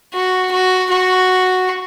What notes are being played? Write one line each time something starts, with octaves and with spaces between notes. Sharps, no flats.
F#4
F#4
F#4